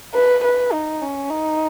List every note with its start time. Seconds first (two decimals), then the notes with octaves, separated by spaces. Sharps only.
0.14 B4
0.44 B4
0.73 D#4
1.02 C#4
1.30 D#4